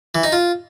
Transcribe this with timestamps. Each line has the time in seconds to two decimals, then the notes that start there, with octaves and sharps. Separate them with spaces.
0.15 E3
0.23 D#4
0.32 F4